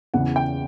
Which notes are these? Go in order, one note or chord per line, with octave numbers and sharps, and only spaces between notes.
E2 C#3 E3 F#5
G5